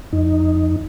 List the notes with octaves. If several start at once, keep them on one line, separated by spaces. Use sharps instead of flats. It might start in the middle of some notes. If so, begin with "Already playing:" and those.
F2 D#4